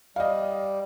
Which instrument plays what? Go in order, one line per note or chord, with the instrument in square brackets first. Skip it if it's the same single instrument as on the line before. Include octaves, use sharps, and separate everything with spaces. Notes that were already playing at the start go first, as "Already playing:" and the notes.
[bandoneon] G3 [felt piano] D#5 F5